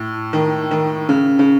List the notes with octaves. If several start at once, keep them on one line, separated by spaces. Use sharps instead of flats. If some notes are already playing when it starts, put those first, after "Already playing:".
Already playing: A2
D#3
D#3
C#3
C#3